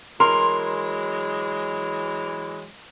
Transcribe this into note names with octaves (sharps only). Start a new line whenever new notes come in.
E3 F#3 G#3 A#4 C6